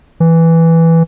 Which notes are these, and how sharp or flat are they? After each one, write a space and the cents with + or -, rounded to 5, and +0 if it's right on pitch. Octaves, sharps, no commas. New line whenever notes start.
E3 +0